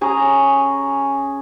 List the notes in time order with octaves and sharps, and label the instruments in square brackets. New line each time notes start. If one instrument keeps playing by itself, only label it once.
[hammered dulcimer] C#4 G#4 A#5